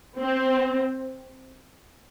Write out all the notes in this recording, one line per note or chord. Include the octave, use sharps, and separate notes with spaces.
C4